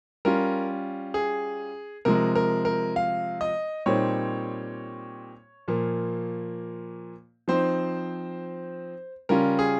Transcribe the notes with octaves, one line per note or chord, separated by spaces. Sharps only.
G3 C#4 F4 A#4
G#4
C3 F3 G#3 A#4
A#4
A#4
F5
D#5
A#2 G3 C4 D#4 C#5
A#2 F3 A#3
F3 C4 D#4 C5
C#3 G3 C#4 F4 A#4
G#4